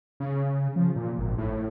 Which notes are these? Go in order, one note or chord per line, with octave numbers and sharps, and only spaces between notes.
C#3
F3
A#2
G#1
A2